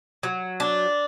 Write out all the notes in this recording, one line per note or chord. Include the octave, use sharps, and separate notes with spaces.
F#3
D4